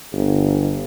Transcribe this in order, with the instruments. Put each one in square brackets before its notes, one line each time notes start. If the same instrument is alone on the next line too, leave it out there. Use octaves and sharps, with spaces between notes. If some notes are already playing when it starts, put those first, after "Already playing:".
[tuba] G1